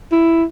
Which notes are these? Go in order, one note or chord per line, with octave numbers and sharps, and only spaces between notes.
E4